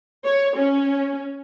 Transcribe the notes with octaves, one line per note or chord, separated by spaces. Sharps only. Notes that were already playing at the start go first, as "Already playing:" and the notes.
C#5
C#4